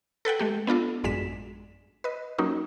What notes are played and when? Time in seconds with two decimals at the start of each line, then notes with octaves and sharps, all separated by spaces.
0.25 A4 B4 F#5 G5
0.39 G#3 A3 G4
0.67 B3 D4 F4 A4
1.04 A1 F#2 G#3 D5 B6 E7
2.04 B4 D#5
2.38 F#3 A#3 C#4 D#4